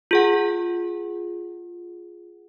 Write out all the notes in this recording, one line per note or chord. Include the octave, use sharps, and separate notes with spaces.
F4 G#4 F#5